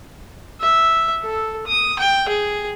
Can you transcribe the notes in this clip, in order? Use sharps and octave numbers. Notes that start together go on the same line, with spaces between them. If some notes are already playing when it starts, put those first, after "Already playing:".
E5
A4
D#6
G5
G#4